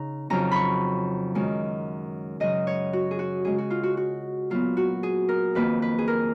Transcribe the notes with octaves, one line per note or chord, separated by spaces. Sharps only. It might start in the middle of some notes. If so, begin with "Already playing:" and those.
Already playing: C#3 D#4 A#5
F2 C#3 F#3 C#4 A#5
B5 C#6
F#2 D#3 G#3 C#4
F#2 C#3 F#3 D#5
C#5
F#4
G#4
F#4
C#3 G#3 C#4 G#4
F#4
F4
F#4
F#4
A#2 F#3 B3 F4
F#4
G#4
A#4
F2 D#3 A#3 D#4 B4
B4
G#4
A#4